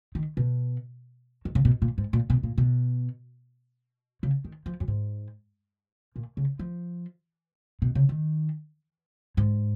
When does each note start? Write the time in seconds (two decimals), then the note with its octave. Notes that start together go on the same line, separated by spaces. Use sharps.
0.15 D#3
0.37 B2
1.45 D#3
1.55 C#3
1.65 B2
1.82 A#2
1.98 G#2
2.13 A#2
2.30 B2
2.43 A#2
2.58 B2
4.23 C#3
4.45 D#3
4.66 F3
4.80 F#2
4.88 G#2
6.16 A#2
6.37 C#3
6.59 F3
7.82 B2
7.95 C#3
8.09 D#3
9.37 G#2